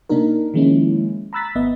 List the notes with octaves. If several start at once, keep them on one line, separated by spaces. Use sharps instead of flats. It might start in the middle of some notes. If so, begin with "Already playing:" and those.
C3 A#3 D4 D#4 A#4
D#3 F3 G#3 A#3 C#4 E4
A#5 B5 E6 F#6 A6 B6
G#1 B3 D#5 E5